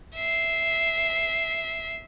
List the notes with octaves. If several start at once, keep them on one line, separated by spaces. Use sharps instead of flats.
E5 C7